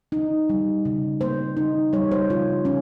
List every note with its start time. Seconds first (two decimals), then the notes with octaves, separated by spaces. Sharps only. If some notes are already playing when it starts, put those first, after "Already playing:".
0.12 D#4
0.49 G3
0.85 C#3
1.21 A#3 C5
1.57 D#4
1.93 G3 C#5
2.12 C5
2.30 C#3 F4
2.65 C#4